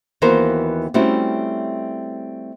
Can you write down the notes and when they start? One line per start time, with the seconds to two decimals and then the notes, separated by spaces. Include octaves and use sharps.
0.22 D#2 E3 B3 F#4 A#4 C5
0.94 G3 A3 C4 C#4 E4 F#4